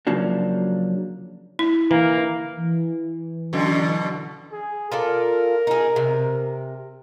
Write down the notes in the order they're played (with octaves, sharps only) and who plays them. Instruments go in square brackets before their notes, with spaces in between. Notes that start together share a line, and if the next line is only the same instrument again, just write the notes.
[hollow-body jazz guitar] C#3 F3 F#3 A#3 D4
[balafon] E4
[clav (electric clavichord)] E3 [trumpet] A#3
[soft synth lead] E3
[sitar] F#2 B2 D3
[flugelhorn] G#4
[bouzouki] F4 A4 D5 [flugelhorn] A#4
[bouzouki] D#4 G#4
C3